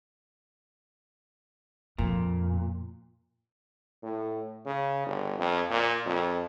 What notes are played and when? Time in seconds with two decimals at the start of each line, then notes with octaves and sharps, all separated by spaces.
1.98 F2 A#2
4.03 A2
4.66 C#3
5.06 G1
5.38 F2
5.71 A#2
6.06 F2